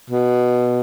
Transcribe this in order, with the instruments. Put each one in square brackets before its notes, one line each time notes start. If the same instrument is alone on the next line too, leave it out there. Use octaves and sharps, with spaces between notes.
[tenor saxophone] B2